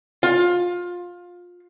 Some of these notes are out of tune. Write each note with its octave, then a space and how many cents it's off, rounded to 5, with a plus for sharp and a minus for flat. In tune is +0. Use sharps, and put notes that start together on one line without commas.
F4 +20